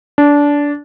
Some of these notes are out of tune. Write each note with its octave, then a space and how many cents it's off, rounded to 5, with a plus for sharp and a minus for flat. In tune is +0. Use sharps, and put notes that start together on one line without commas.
D4 -20